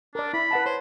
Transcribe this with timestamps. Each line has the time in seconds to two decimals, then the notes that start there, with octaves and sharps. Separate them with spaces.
0.15 D4 A#4 D5
0.33 E4 B5
0.51 B4 F#5 A5
0.66 C5 C#5